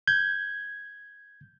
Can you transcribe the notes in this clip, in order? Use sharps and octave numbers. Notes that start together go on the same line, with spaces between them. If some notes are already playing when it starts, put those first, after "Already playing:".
G6 G#6